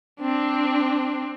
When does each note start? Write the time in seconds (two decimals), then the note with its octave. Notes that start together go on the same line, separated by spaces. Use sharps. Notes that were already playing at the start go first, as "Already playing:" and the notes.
0.20 C4 D4